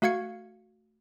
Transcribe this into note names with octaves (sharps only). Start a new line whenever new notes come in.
A3 F#4 F5 G#6 C#7